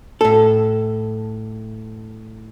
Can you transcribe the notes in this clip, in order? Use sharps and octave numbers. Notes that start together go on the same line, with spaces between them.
A2 A4